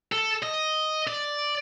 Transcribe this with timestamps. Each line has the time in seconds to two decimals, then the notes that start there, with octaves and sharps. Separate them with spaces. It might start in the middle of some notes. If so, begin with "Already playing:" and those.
0.12 A4
0.43 D#5
1.07 D5